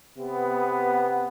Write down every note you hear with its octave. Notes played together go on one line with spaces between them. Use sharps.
C3 B3